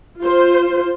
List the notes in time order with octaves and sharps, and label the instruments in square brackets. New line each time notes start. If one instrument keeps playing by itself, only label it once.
[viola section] F4 C5